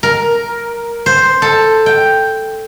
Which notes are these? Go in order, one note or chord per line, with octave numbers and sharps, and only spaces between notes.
A#4
C5
A4
G5